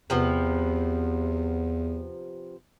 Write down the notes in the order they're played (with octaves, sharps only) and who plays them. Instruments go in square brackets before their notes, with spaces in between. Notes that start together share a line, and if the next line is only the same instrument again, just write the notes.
[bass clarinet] E2 [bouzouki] C3 F3 B3